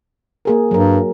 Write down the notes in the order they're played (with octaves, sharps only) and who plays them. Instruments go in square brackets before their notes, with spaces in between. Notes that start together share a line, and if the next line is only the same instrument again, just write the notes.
[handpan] A#3 G#4 A#4
[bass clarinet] G2 [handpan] F#3 A#4